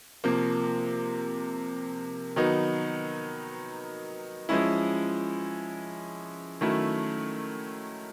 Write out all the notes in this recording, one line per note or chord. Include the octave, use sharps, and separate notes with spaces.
C3 F3 A#3
D#3 F#3 B3 D#4
F3 G#3 C#4 E4
D#3 F#3 A3 C#4 E4